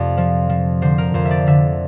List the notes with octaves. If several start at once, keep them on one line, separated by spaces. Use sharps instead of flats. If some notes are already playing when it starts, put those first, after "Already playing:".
Already playing: F2 C3 D5
F3
F3
D3 C5
A#4
F2 C5
E5
D5
D3 E5